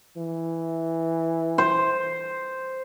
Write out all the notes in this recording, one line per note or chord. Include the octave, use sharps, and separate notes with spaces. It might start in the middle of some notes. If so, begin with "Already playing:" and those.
E3
C5